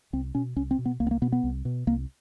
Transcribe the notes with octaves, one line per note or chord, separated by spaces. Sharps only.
C2 C4
B2 C#4
C2 C#4
C4
B2
B3
C2 A#3
B3
A#3
B2 B3
B3
C2
B2
C2 A#3